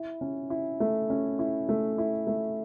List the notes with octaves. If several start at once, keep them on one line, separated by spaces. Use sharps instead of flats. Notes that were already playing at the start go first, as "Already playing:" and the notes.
Already playing: E4
C#4
E4
A3
C#4
E4
A3
E4
A3